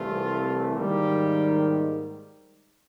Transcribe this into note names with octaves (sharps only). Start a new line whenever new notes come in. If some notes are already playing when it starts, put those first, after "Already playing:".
Already playing: C2 C3 E3 A3 F4
G#2 D#3 G3 A#3 G4